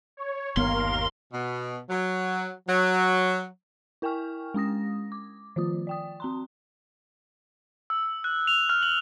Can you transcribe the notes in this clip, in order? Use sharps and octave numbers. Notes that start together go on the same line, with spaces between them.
C#5
G1 D#2 B3 A#4 F5 C6
B2
F#3
F#3
E4 A#4 G5 G#5 C#6 F6
G#3 C#4 D#6 A#6
D6
D#3 F3 F4 D#6
D5 G5 D#6
C4 A#5 C6
E6
F#6
F7
F6
F#7